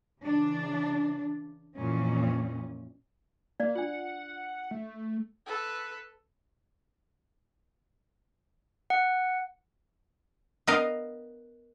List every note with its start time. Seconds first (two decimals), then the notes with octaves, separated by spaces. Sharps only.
0.21 C#3 E3 D4
1.76 F2 A#2 E3 C#4
3.60 A#3 D5 F5
3.75 D4 F4 F#5
4.71 A3
5.46 A4 B4
8.90 F#5
10.67 B3 A#4 D#5 F5